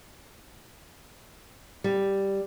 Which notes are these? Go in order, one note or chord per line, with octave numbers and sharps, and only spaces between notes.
G3